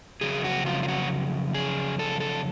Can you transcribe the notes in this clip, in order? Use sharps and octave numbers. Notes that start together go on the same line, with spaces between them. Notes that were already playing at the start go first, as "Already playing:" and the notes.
F2 C#3 F#3 G#4
F#4
F4
F4
F#4
G#4
A4
A4